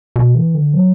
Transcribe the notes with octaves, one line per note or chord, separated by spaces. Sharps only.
B2
E3
D3
F#3